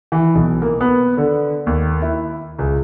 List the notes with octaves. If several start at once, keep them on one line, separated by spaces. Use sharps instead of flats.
E3
B1
A#3
B3
D3
D#2
E4
C#2